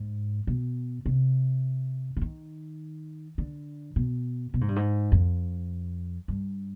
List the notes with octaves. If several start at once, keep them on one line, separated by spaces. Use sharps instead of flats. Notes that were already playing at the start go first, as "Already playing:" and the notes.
Already playing: G#2
B2
C3
D3
D#3
D3
B2
B2
G#2
G2
G#2
F2
G2